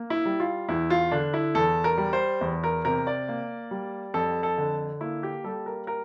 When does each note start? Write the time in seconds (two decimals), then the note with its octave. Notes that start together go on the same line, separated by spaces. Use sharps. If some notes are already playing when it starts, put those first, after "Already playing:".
Already playing: A#3
0.10 E4
0.25 G3
0.40 F4
0.69 E2 E4
0.90 F4
1.11 D3 D4
1.34 E4
1.55 E2 A4
1.84 A#4
1.98 G3
2.13 C5
2.41 E2
2.64 A#4
2.85 C3 A#4
3.07 D5
3.28 A#3
3.71 G3
4.14 F2 A4
4.43 A4
4.58 D3
5.01 A#3 E4
5.23 G4
5.44 G3 A4
5.66 A#4
5.87 A#4